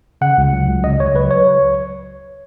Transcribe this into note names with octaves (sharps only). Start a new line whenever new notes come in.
C#3 F#5
C#2
F#3
C#2
C#3 D#5
C#2 C#5
F#3 B4
C#5